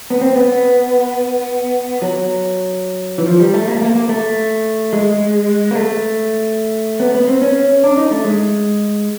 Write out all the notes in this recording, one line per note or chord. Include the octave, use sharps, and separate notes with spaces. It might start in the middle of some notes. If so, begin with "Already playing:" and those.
B3
C4
B3
F#3
E3
F3
G3
A3
A#3
A3
A#3
A#3
A3
G#3
A#3
A3
B3
B3
C4
C#4
D4
D#4
A3
G#3